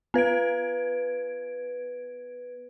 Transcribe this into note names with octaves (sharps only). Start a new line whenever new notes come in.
B3 B4 G#6 D7